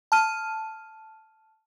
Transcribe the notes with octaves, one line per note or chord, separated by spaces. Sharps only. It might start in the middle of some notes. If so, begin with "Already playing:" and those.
A5 F6 D#7